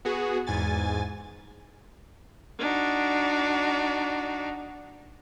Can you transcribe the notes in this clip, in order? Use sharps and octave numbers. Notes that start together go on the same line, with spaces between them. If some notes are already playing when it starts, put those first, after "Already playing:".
B3 F#4 G#4
E2 G#2 G#5 A6
D4 D#4 F#4